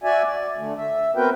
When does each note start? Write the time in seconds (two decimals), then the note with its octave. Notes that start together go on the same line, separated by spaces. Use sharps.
0.04 F#4 D5 E5 G#5
0.25 D5
0.58 D3 A3
0.77 E5
1.16 B3 C4 F#4 A#4 B4 G5